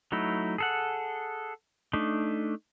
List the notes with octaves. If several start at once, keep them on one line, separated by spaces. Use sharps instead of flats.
F#3 A3 D#4 E4
G#4 A4 F#5
A3 D4 D#4